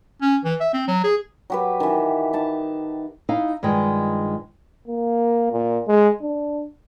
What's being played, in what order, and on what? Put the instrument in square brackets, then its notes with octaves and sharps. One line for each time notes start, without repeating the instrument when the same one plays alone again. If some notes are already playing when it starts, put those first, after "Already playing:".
[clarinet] C#4
E3
E5
C4
F#3
G#4
[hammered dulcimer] F#3 G4 B4
D#3 E3
D#4 A5
[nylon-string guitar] D#4 E4 F5
G2 D#3 F3 G#3
[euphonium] A#3
A#2
G#3
D4